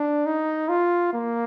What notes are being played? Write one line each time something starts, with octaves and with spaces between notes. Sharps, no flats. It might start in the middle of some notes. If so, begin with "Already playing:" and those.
Already playing: D4
D#4
F4
A#3